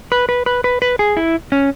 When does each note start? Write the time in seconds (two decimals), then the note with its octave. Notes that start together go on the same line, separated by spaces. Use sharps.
0.12 B4
0.29 B4
0.46 B4
0.64 B4
0.82 B4
0.99 G#4
1.17 E4
1.52 C#4